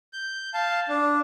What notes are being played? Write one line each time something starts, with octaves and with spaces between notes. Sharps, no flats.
G6
F5 A5
D4